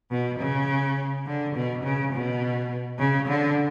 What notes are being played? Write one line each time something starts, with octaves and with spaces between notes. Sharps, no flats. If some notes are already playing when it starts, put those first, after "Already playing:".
B2
C#3
D3
B2
C#3
B2
C#3
D3